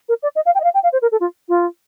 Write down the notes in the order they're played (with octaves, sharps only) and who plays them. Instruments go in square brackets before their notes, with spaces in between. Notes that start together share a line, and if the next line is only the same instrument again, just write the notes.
[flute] A#4
D5
D#5
F5
G5
D#5
F5
G5
F5
C5
A#4
A4
F4
F4